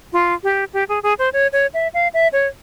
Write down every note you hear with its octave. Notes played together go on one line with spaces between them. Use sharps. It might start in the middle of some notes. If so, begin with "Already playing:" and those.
F4
G4
G4
G#4
G#4
C5
C#5
C#5
E5
F5
E5
C#5